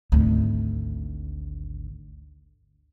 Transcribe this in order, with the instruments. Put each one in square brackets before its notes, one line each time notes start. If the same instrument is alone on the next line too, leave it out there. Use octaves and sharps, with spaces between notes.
[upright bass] G#1 D2